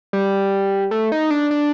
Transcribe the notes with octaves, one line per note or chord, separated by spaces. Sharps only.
G3
A3
D#4
D4
D4